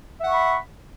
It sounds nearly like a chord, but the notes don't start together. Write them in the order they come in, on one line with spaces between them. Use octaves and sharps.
E5 F#5 C#6 B5